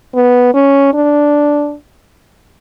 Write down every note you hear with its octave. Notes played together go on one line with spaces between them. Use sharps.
B3
C#4
D4